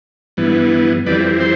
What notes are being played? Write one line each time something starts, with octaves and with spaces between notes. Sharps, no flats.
G2 E3 B3
F2 E3 G3 C4 B4 D5
C5